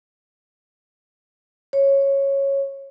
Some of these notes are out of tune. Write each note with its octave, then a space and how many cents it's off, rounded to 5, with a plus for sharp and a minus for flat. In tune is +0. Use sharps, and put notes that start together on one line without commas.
C#5 -10